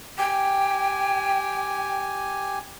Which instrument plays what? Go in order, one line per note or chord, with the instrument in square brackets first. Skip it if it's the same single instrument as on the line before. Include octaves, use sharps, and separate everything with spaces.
[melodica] G4 G#5 [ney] G5